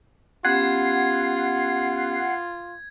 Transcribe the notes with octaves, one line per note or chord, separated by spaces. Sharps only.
B3 C#4 F4 G4 F#5 G#6 C7